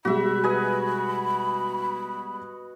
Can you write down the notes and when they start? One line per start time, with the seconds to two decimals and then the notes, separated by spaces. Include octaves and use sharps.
0.05 B2 G3 G#3 F#4 E5 B5
0.44 B4 D#5 G#5